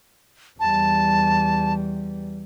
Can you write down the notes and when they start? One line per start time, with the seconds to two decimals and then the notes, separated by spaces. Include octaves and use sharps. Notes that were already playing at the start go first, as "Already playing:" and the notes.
0.60 E2 G3 A5